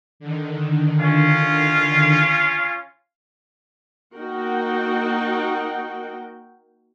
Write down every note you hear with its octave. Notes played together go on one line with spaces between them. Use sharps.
D3 D#3
C#4 F4 F5
A#3 D#4 F#4 A#4 F#5 G5